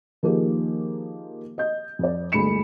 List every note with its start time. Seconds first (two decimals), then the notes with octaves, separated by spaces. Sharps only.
0.23 D#3 F3 A#3 G4 G#4
1.58 D#5 G6
1.99 F2 D5
2.32 G1 D2 G#3 B5 C#7 E7